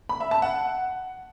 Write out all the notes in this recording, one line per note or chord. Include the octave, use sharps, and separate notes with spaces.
B5
E5
A5
F#5